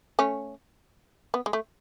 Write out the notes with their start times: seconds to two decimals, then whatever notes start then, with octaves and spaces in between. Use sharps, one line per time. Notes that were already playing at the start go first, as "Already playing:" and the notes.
0.19 A3 C#4
1.34 B3
1.46 G#3
1.53 A3